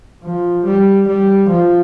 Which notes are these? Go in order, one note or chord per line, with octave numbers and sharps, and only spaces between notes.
F3
G3
G3
F3